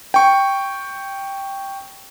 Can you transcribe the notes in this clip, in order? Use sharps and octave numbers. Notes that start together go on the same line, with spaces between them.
G5 C#6